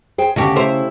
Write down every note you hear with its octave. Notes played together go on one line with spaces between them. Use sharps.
G#4 C5 G5
D2 C#3 F#4 G4 A5
E4 G4 C5